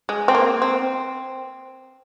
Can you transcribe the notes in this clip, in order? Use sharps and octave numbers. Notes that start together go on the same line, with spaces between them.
G#3
C4
A#3
C4